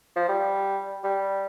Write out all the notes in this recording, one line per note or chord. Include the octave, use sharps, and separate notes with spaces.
F3
G3
G3